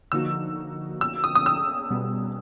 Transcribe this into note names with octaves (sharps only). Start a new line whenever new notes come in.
D3 F3 A#3 D#4 F#4 E6
E6
D#6
D#6
E6
B2 G3 B3